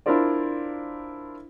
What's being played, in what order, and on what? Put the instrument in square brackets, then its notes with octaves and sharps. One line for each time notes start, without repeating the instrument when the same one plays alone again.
[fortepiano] D4 E4 F4 A#4 C5 D5